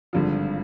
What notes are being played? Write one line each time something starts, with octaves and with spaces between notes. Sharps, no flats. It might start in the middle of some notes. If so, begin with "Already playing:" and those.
G#1 G2 D3 F3